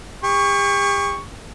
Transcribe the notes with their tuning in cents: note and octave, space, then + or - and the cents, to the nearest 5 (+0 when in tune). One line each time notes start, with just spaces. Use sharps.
G4 +40 C#6 +0